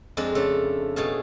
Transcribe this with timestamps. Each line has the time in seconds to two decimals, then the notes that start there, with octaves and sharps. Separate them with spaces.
0.17 F2 G#3 C4 D4 F4
0.35 C#3 A3 D4 A4
0.96 B2 A3 G#4 F5 A5